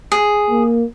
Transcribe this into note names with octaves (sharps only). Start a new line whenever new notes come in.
G#4
A#3